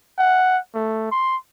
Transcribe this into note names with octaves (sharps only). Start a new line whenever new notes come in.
F#5
A3
C6